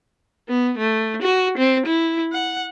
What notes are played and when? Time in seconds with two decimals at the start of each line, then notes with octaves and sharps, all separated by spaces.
0.48 B3
0.78 A3
1.22 F#4
1.58 C4
1.86 E4
2.32 F#5